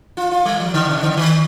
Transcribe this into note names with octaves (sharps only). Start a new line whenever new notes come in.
F4
F4
G3
F3
D3
C3
D3
D#3